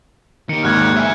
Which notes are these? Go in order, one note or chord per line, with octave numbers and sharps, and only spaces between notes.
D#3 G4 C#7
G#1 D#2 G#2 F6 F#6 G#6
E5 G#5